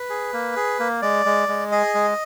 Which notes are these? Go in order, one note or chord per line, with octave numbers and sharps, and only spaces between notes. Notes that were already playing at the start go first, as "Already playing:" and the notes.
Already playing: B4
G#4
A#3
G#4
A#3
G#3 D5
G#3
G#3
G#4 D#5
G#3